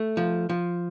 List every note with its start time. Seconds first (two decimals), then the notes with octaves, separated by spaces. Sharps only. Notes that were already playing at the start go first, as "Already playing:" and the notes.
Already playing: A3
0.17 F3
0.49 F3